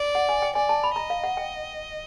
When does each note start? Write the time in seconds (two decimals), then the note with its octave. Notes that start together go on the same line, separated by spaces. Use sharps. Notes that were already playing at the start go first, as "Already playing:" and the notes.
Already playing: D5
0.15 F#5
0.29 G#5
0.42 G5
0.55 D5 G#5
0.69 A5
0.83 B5
0.96 D#5 A#5
1.10 F5
1.24 F#5
1.37 G5